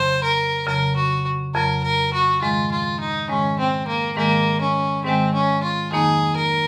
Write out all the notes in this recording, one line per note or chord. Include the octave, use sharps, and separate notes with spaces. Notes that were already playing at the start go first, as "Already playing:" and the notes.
Already playing: F2 C#3 F#3 C5
A#4
F2 C#3 F#3 A#4
F#4
F2 C#3 F#3 A#4
A#4
F#4
G#2 D#3 G#3 F4
F4
D#4
G#2 D#3 G#3 C#4
C4
A#3
G#2 D#3 G#3 A#3
C#4
G#2 D#3 G#3 C4
C#4
F4
F2 D#3 F#3 A#3 D#4 G#4
A#4